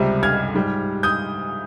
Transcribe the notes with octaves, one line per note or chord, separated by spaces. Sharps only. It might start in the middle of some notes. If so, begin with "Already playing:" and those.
Already playing: C#2 C3 G3
F6 G#6
G#2 G3
D#6 G6